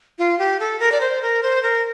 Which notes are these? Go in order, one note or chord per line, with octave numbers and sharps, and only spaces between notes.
F4
G4
A4
A#4
D5
C5
A#4
C5
A#4